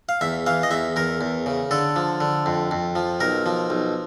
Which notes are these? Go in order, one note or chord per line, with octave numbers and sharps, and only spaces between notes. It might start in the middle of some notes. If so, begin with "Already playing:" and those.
F5
E2 E5
E3 F5
D#5
E2 E5
E2 A#4
E2
C#3
D3 A4
F3
D3
F2
F2
F3
B1 A#4
F3
B1